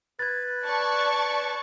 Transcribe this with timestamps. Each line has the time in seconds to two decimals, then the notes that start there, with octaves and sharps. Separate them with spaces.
0.19 B4 G#6 A6
0.64 D5 A5 C#6